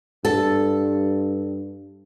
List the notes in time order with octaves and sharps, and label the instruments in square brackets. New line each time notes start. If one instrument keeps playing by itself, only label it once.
[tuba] G2 [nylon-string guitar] A4